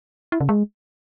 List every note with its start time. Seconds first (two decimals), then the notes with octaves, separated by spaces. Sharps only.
0.32 E4
0.40 C#3
0.49 G#3